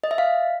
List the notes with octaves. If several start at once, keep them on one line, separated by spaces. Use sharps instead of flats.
D#5
E5
F5